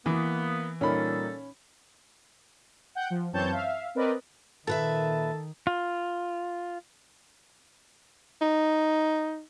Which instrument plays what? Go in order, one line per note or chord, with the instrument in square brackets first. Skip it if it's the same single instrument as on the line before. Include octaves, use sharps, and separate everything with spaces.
[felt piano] E3 [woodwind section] A#3 B3
[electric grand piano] A#2 D#4 A#4 [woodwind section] G3 A4 [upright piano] C#4 B5
[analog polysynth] F#5 G5 G6
F3
F#2 E3 C4 C#5 A5 G6
E5 F5
C4 A#4 B4 D5 D#5
[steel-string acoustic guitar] A#2 B4 E5 [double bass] D#3 [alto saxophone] A4
[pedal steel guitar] F4
[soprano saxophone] D#4